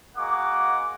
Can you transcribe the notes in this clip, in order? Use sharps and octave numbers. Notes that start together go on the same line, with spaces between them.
G#3 A#3 F#4 F#5 D6